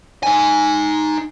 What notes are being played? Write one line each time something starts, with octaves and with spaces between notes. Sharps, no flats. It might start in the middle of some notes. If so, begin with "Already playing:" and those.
D#4 G#5